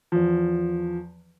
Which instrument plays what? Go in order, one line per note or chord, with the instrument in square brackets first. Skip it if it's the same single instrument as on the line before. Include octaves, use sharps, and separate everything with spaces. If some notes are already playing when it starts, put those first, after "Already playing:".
[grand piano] E2 F3